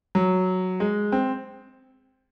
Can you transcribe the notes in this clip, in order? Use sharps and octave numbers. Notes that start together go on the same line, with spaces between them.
F#3
G#3
C4